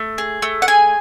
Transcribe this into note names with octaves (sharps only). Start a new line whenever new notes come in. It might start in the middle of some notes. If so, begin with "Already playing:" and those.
Already playing: A3
G#4
A3
F#5
G#4 G#5